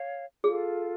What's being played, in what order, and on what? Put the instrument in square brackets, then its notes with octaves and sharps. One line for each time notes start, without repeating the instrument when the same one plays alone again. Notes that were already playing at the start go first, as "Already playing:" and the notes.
Already playing: [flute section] C#5 F5
[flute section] F4 A4 F5 [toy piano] G#4